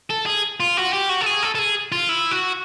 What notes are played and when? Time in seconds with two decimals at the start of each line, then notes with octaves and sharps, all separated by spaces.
0.10 A4
0.26 G#4
0.60 F4
0.77 F#4
0.93 G4
1.10 F#4
1.21 A4
1.27 G#4
1.43 A4
1.55 A4
1.59 G#4
1.92 F4
2.09 E4
2.31 F#4